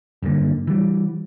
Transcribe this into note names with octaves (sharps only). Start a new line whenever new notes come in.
F#1 G2 D3 A#3
E3 G3